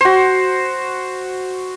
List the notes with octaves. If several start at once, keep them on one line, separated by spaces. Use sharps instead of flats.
F#4 C5